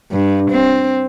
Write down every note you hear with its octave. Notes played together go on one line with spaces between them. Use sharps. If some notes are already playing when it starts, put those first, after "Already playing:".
G2
C4